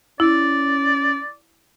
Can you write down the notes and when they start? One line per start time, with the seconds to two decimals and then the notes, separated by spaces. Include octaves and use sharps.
0.20 C#4 E4 D5